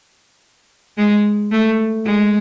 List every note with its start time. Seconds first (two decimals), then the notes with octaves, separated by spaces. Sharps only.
0.97 G#3
1.51 A3
2.05 G#3